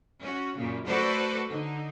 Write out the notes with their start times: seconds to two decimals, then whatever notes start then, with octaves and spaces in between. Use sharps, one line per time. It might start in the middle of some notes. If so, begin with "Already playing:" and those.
0.21 C#4 F#4
0.56 F#2 A#2 C#3
0.85 A3 F#4 A4 B4 C5 D5
1.49 D3 D#4